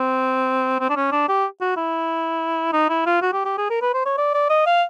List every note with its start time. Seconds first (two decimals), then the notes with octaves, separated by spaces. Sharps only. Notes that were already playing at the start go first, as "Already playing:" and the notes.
Already playing: C4
0.80 C4
0.90 D4
0.96 C#4
1.11 D4
1.29 G4
1.61 F#4
1.77 E4
2.73 D#4
2.89 E4
3.06 F4
3.22 F#4
3.33 G4
3.45 G4
3.58 G#4
3.70 A#4
3.81 B4
3.94 C5
4.05 C#5
4.18 D5
4.34 D5
4.49 D#5
4.66 F5